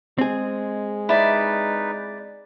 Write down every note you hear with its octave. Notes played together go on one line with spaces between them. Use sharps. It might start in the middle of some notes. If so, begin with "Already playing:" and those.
G#3 C4 G#4
D#4 E4 B4 D5